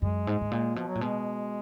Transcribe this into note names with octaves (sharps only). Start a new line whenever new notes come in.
F#2 G#3
G#2
G#2
A#2
B2 F3
F#3
A#2
B2 G#3